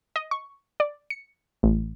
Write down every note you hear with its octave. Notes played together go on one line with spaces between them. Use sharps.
D#5
C#6
D5
C#7
A1